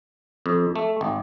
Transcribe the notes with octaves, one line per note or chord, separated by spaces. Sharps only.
F2
A3
G#1